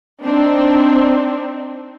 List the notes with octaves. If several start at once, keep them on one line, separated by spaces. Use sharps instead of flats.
C4 D4 D#4